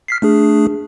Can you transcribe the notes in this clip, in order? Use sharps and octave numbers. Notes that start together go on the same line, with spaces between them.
F6 B6 C7
A3 D4 G#4